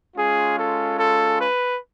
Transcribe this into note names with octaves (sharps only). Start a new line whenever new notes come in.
G#3 C#4 F4 G#4
A4
A4
B4